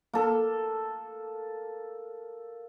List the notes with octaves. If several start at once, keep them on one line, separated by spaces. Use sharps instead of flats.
A#3 A4